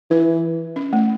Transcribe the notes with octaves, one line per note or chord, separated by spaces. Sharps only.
E3 B4
C#4
A3